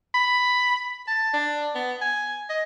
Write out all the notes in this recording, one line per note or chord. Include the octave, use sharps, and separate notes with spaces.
B5
A5
D4
B3
G#5
D#5